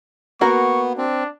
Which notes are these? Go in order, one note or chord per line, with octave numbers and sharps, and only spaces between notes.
A#3 B3 F#4 A#4 C#6
C4 D4